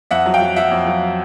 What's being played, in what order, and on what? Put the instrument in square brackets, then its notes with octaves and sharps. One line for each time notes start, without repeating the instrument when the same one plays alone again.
[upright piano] F2 E5 F#5
F#3
F5 G5
F#3
F#3 E5 F#5
F2
F#3